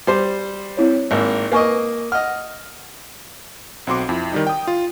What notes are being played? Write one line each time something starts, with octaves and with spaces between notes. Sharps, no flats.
G3 C5
C4 E4 C#5
G#1 G#2 A#3
A#3 B4 D#5 G#5 C#6
D#5 F#5 F6
B1 C4 F#4 C6 D6
F2 E4
D#3 G3 D#4
G5 D#6
F4